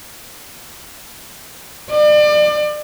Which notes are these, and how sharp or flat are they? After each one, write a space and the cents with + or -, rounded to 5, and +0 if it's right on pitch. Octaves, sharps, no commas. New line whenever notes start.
D5 +35